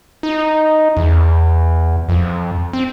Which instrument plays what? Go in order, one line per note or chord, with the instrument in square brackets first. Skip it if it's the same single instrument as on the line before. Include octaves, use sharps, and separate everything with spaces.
[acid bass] D#4
E2
F2
C4